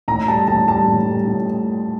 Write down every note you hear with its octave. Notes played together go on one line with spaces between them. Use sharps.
A2 A#5
G3 A5
A2 A5
G3 A5
A2
G3
A2